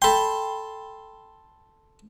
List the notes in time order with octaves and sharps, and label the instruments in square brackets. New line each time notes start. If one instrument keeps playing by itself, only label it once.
[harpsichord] A4 C6 [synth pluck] G5 B5